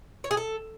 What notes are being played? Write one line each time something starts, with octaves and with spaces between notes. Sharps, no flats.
C#5
G#4
A4